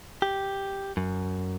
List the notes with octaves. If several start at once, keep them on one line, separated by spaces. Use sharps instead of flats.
G4
F#2